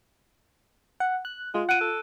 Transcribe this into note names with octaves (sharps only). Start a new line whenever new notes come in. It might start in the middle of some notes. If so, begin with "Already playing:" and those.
F#5
F#6
G#3 F4
F#5 F#6 D7 D#7
A4